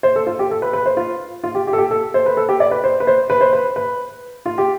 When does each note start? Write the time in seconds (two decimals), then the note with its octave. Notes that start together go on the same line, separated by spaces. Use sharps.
0.03 C5
0.16 A4
0.27 F4
0.39 G4
0.51 A4
0.62 B4
0.73 B4
0.86 C5
0.97 F4
1.44 F4
1.55 G4
1.67 G4
1.73 A4
1.78 G4
1.91 A4
2.14 C5
2.26 B4
2.37 A4
2.49 G4
2.60 D5
2.71 B4
2.84 C5
3.00 B4
3.07 C5
3.30 B4
3.41 C5
3.53 B4
3.76 B4
4.46 F4
4.58 G4